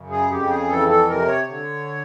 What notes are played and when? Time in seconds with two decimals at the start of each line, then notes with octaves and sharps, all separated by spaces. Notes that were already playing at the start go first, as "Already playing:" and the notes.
Already playing: F#2 C#3
0.10 G#4
0.31 F2 G4
0.50 G#4
0.69 E3 A4
0.89 A4
1.09 C3 A#4
1.27 C#5
1.47 D3